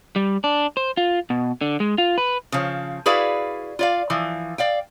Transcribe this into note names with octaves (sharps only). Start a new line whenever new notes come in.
G3
D4
C5
F4
B2
D3
G#3
F4
B4
C#3 F3
E4 F#4 G#4 B4 D5 F5
F4 D5 F5
E3 F3
D5 F5 G5